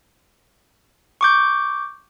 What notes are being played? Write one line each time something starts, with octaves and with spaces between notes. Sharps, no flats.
C#6 D6 G6